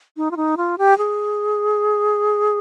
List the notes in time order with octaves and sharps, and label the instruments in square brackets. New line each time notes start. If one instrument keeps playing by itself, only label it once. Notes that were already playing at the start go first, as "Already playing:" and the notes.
[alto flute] D#4
F4
D#4
F4
G4
G#4